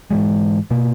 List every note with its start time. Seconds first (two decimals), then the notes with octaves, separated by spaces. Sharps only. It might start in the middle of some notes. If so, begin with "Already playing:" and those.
0.11 G#2 E3 G#3
0.71 B2 A#3